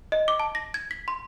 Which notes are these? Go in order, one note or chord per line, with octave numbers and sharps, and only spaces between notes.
D#5
D6
A5
A#6
G#6
B6
C6